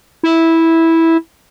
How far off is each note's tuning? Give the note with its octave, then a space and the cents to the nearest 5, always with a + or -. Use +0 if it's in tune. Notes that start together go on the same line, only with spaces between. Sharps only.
E4 -10